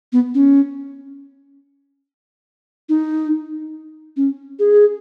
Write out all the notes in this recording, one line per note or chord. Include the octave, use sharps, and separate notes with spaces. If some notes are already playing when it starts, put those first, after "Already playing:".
B3
C#4
D#4
C#4
G#4